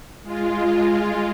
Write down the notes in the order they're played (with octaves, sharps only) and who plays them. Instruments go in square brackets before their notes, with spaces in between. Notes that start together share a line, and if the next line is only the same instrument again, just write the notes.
[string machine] G#3 F4